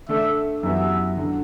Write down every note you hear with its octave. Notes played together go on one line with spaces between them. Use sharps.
D3 A3 D4 A4 E5
F#2 E3 G3 B3 F#4 E5
D3 F#3